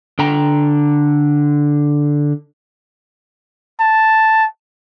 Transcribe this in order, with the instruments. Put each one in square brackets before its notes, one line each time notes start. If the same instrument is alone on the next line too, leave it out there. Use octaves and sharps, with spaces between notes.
[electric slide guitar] D3 G5 A#5
[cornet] A5